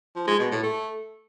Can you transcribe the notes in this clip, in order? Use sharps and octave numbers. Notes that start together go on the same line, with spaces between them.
F3
G#3
B2
A2
A3